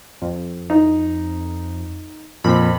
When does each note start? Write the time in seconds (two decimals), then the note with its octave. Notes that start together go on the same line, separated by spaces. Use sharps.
0.22 F2
0.70 D#4
2.44 F2 A#2 C4 B5